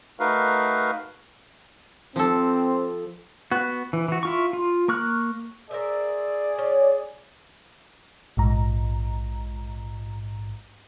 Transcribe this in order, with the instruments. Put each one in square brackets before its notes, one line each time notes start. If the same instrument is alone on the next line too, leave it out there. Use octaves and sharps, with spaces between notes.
[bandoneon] A3 D#4 F#4 A#4 B4 F5
[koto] F3 A4 [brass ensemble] C4
[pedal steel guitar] B3 F#4
E3
E3 F#4
E4 F4 C#6
F4
A#3 C#6 F6 F#6
[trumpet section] G#4 D5 [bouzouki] A#4 C5 E5
[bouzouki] C#4
[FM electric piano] A#1 G#2 A#5